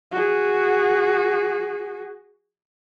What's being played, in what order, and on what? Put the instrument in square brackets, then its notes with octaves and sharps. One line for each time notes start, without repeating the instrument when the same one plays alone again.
[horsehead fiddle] F#4 G#4